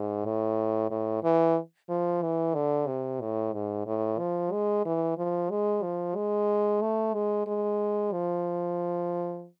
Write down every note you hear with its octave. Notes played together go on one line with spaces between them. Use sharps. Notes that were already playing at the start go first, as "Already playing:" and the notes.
Already playing: G#2
A2
A2
E3
F3
E3
D3
C3
A2
G#2
A2
F3
G#3
E3
F3
G#3
F3
G#3
A3
G#3
G#3
F3